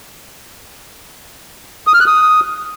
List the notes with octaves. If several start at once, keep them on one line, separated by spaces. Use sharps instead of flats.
D#6
F6
F#6
D#6